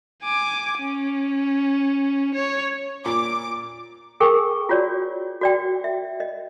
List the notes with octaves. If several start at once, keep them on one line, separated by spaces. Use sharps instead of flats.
G#5 D6
C#4
C#5
A#2 D6
G#4 A#4 G5 G#5 C#6
F4 F#4 C#5 D5
F#4 D5 G5
E5
D#5